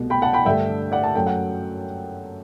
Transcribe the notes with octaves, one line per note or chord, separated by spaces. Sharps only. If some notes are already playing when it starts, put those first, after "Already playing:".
Already playing: C2 B2 A3
G5 B5
F#5 A5
G5 B5
G2 D3 A3 E5 G5
D5 F#5
A5
F#2 F#3 A3 G5
F#5